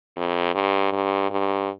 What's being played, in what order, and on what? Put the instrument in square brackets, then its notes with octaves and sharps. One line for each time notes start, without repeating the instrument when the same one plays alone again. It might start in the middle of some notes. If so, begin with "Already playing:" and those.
[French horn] F2
G2
G2
G2